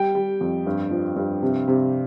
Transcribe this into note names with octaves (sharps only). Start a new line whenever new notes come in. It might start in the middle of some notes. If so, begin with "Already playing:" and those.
Already playing: G3 G5
G3
F2
G2
F3
G2
C3
C3